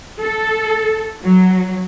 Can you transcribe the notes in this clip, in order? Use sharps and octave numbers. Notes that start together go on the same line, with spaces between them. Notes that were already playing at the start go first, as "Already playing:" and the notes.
A4
F#3